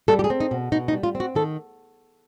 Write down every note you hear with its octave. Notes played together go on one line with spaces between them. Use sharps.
G3 A4
G4
G#4
C4
D#4
B2
B2 D#4
D#4
G3
F4
C4
F#4
D#3 A4